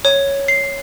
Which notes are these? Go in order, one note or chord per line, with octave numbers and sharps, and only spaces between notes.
C#5
C7